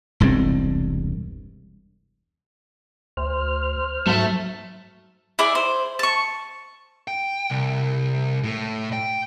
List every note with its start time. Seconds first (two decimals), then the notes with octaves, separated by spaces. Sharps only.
0.20 E1 C2 G2 C4
3.17 D2 C5 F6
4.07 G#2 F#3 A3 E5
5.39 E4 G#4 D5
5.55 C5
5.99 A5 C#6
7.08 G5
7.50 C2
8.44 A2
8.93 G5